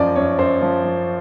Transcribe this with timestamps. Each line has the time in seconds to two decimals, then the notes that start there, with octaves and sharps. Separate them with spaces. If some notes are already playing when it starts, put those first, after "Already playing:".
Already playing: F#2 F3 D5 D#5
0.16 F#2 C#5
0.39 F#2 C5
0.62 F3
0.84 F3